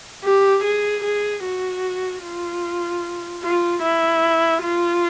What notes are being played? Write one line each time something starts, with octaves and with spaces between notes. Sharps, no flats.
G4
G#4
G#4
F#4
F4
F4
E4
F4